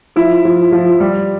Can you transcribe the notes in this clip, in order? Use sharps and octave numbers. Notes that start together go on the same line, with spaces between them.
F3 E4
F3
F3
G3